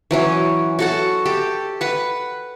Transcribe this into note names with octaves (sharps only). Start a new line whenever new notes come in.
E3 F#3 C#4
F#4 A4 F#5
G4 A4
B4 F#5